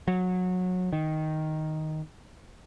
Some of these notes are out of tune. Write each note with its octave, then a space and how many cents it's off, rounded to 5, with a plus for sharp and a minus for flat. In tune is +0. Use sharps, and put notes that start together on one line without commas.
F#3 -20
D#3 +5